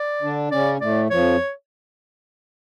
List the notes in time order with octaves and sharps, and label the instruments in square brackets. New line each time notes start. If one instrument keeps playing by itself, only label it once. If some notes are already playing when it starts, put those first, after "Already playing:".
Already playing: [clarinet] D5
[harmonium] D3 D4
[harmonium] C#3 C#4 [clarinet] D5
[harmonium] A2 A3 [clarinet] D5
[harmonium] F2 F3 [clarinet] C#5